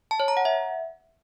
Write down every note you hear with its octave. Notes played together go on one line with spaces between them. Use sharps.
A5
C#5
A#5
F#5
E5